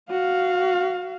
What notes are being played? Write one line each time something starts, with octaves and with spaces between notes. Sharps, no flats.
F#4 F5